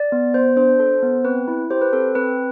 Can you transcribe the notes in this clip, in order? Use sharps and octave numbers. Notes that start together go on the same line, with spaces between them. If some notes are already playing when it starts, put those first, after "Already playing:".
Already playing: D5
B3
B3 C5
D4 C5
A4
B3
C4 B4
E4
G4 C5
B4
C4 A4
C4 B4